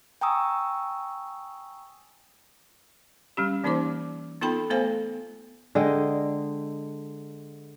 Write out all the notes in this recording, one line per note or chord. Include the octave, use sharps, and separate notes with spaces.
G5 G#5 A#5 C#6 D#6 E6
G3 C#4 G4
E3 A#3 C#4 D#4 C5 D6
B3 D#4 F4 A4 G5 B5
A3 B3 A4 C5 F5 G#5
D3 G#3 D#5 G5